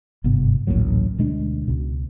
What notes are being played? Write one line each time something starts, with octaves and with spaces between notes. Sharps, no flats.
G1 G#2 C3 B3
A1 D2 A#2 F#3
D2 B2 G#3 D4
C#2 B2